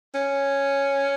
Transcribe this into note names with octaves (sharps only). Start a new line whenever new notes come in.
C#4